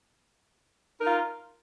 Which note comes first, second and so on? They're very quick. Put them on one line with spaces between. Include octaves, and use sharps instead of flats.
A#4 D#4 F4